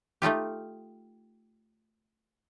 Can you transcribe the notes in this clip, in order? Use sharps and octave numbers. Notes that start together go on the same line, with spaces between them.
A3 D#4 F4 G4